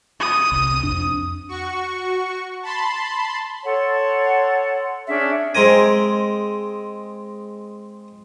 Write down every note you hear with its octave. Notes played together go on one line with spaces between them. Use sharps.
D#6
C2
F2 D4
F#4 C#6
A5 B5 C6
A4 C#5 F#5 C6
C#4 D4 G#4 E5
G#3 C4 A#4 G#5